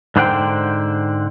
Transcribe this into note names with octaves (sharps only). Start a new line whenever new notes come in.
G#2 D3 C5 F#5 G5